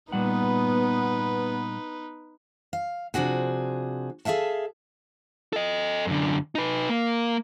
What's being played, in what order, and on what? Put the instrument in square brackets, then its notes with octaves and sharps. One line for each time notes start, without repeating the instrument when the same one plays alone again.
[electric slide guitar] A#2 G3 F#5 [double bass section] B3 [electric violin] D#4 B4
[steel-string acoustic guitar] F5
C3 F3 D4 F#4 G#4
G#4 A4 E5 F5 A5
[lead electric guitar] A4 D#5
F#2 D3
D#4 B4
A#3